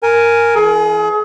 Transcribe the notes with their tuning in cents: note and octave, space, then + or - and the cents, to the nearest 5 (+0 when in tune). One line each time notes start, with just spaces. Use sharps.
A#4 +0 G#5 +0
E3 +0 G#4 +35